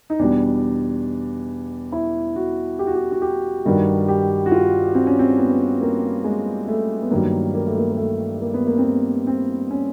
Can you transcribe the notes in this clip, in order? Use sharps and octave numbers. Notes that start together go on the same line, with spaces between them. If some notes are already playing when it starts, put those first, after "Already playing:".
D#4
E2 B2 G3 D4
E4
F#4
G4
F#4
G4
F#4
G4
G2 D#3 G3 F#4
G4
F#4
F4
C4
C#4
C4
B3
A#3
G#3
A3
B3
G2 D#3 F#3 A#3
A#3
A3
A#3
A#3
A3
A#3
B3
A#3
C4
B3
C4
C#4